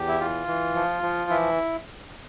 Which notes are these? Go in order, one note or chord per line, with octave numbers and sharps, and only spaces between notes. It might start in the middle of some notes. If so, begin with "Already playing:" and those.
Already playing: E2 G4
E4
E3 F4
E3
F3
F3
E3 E4